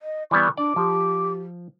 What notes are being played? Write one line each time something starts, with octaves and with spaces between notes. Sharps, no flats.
D#5
E3 G3 B3 D5 C#6
D4 D5 D6
F3 G4